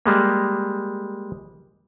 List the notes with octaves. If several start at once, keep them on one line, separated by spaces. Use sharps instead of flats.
G3 G#3 A#3